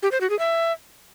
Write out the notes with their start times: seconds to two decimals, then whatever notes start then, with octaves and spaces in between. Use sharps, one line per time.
0.03 G4
0.12 C5
0.21 F#4
0.30 G#4
0.39 E5